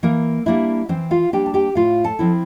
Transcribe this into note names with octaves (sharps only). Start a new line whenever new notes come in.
E3 A#3 A#4
G3 A#3 D4 E4 E5
E3 C4 C5
F4 F5
G3 A#3 D4 G4 G5
A5
G4 G5
A2 F4 F5
A4 A5
F3 C4 E4